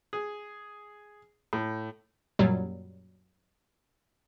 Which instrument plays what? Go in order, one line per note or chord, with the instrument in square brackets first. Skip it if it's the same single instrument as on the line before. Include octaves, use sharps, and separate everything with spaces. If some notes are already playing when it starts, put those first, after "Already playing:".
[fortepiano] G#4
A2
[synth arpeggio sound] F#2 A#2 F#3 G3